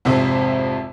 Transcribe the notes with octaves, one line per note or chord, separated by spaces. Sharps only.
G#1 F2 C3 C5 E5